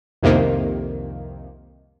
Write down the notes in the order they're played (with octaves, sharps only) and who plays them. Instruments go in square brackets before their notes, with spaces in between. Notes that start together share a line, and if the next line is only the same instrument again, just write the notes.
[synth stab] C2 F2 C3 D#3 A#3